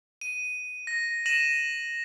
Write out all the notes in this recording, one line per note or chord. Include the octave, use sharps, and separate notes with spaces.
D#7
A#6
A#6 D#7 E7 F#7